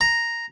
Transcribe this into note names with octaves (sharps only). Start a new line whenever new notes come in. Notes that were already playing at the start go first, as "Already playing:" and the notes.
A#5